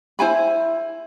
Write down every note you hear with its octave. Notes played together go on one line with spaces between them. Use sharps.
E4 C5 G#5 B5